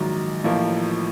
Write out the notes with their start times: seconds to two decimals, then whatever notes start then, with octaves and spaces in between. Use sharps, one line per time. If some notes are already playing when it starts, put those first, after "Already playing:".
Already playing: A#1 G#2 D#3 F#3
0.44 A1 A2 F3 A#3